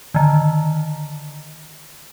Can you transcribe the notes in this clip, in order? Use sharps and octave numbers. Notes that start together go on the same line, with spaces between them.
D3 D#3